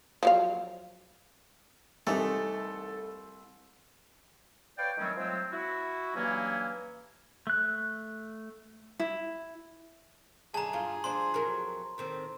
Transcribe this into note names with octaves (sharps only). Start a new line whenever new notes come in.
F3 F#3 F5
C2 E3 A3 D#4 A4
B4 C#5 D5 F5 G5
D#3 F#3 G3 A3 C4 C#4
F3 F#3 G#3 A3 C4
E4 F#4
G2 E3 F#3 A#3 C#4 E4
A3 F#6
E4
F#2 D3 G#4 A5 A#5
G2 F4
F3 D4 C6
F2 F#3 A#4
A2 D#3 C4